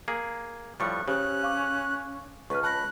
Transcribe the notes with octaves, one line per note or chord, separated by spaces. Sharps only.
A#3 G#4
A2 F3 G3 C#6 F#6
C#3 C#4 G4 C5 C#5 F#6
F5 C#6 D6
C#2 B4 C#6 F6
A5 B5 F#6 A#6